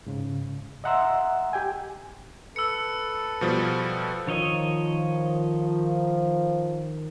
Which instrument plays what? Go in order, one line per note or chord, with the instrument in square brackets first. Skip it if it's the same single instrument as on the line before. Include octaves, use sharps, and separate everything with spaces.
[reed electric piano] G#2 C#3
D#5 E5 F#5 A#5 C6 E6
G4 G5 G#5
[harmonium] A4 B4 [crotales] E6 C#7
[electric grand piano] B2 F3 G3
[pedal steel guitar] D#3 C#5 D#5 [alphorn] F3